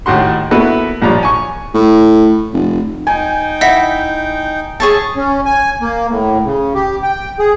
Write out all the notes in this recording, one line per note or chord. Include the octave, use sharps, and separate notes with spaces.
D#2 A2 F#4 F#5 C6
A#3 B3 E4 F#4 A4 B4
A#1 F3 G3 C#5 A#5
G#5 C#6
A2
F1
D#4 G5 G#5
E4 D#5 F#5 B6
G#4 C#5 E5 A5
C#4
G#5
A#3
A2
C#3
G4
G5
G#4